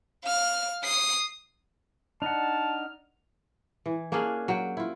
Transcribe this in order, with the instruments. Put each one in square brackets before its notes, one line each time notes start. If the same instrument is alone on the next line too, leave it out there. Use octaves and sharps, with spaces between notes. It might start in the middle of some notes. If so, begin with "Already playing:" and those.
[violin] F5 F6
D#6 C7
[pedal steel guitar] D4 D#4 F#5 [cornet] A5 [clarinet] F6
[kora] E3
A#3 C#4 D4 G#4
F#3 G5
E4 F4